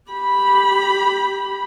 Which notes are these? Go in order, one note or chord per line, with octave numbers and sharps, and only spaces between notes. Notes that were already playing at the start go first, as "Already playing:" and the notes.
G4 B5